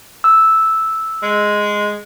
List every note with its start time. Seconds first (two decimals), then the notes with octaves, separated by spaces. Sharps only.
0.24 E6
1.23 G#3